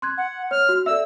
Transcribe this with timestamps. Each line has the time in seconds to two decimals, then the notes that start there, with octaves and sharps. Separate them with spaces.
0.02 C6 F#6 G#6
0.18 F#5
0.51 C#5 F6
0.69 F#4
0.86 A4 D5 E5 E6